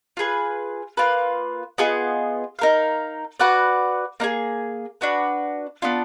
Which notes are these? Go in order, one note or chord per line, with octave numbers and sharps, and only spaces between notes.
F4 G#4 B4
A#3 F4 B4
B3 F4 G#4 D#5
D#4 A#4 F5
F#4 B4 D5 F#5
A#3 D#4 G#4
D4 F#4 B4
B3 D4 F4